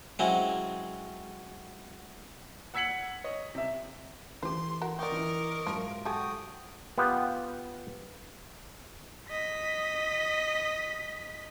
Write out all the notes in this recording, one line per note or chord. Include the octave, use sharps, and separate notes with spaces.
F#3 G#3 C4 C#4 E4
F#5 E6 G#6 B6 C#7 F#7
C#5 D#5
C3 E5
E3 A3 G4 C5 C6
F#4 A#4
A#4 D5 D#5 G5 C#6 D6
E3 E4
G#2 F3 F#3 E5
F#4 G4 A4 G5 G#5 D#6
B3 F4 G4
D#5 B6